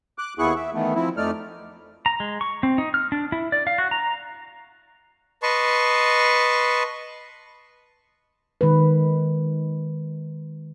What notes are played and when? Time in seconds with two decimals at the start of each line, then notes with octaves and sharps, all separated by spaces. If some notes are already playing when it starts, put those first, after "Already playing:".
0.18 D6 F#6
0.39 D#2 B3 E4 G#4 C#6 F#6
0.56 E5
0.74 D#3 E3 A3 B3
0.95 F3 C4 E4
1.17 F2 A3 D#4 D5 F6
2.06 A#5
2.20 G#3
2.41 C#6
2.63 C4
2.78 D#4
2.94 F6
3.12 D4
3.32 E4
3.52 D5
3.67 F5
3.78 F#4
3.91 A#5
5.43 B4 D#5 A5 C6 C#6
8.61 D#3 G#3 B4